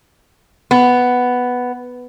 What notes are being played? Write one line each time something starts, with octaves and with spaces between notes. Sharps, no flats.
B3